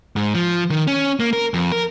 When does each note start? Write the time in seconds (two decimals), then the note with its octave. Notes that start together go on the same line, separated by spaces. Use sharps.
0.16 G#2
0.35 F3
0.70 D#3
0.87 C#4
1.20 A#3
1.33 A#4
1.54 F2
1.72 A#4